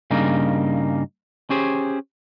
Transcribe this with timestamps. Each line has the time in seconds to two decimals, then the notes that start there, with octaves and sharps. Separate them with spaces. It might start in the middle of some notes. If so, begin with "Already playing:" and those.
0.11 G2 C#3 A#3 D#4
1.50 C#4 G4 G#4 C5